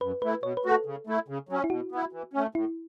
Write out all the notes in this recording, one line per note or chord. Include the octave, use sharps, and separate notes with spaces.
F#2 B4
E3 A3 E4 B4
B2 C#5
B4
A3 F#4
A4
C#3
A3 E4
C#3
F#3 C#4
E4
B2 F#4
B3 E4
E3
A3 C#4
A2 E4